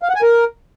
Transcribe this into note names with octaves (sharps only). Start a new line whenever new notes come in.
F5
F#5
G#5
A#4